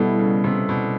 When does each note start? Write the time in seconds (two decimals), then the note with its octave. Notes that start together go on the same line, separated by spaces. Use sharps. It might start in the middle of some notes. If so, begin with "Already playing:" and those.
Already playing: B2 G3 B3 E4 A4
0.19 C#3
0.44 C3
0.69 B2